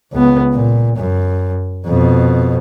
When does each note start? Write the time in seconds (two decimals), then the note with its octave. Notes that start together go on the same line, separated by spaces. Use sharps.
0.12 C#2 B3
0.53 A#2
0.97 F#2
1.86 F2 B2